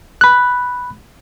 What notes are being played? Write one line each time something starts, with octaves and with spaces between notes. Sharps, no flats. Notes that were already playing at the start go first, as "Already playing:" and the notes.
B5 F#6